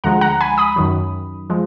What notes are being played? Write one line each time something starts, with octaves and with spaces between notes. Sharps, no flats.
D2 D3 F3 G#3 F#5 A#5
F#5 A#5
G#5 B5
B5 D#6
F#2 D#3 F#3
F3 G#3